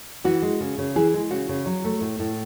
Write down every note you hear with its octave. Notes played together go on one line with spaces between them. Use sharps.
E3 F#4
G#3
C#3
C#3
E3 G#4
G#3
C#3 F#4
C#3
F#3
A3
A2
A2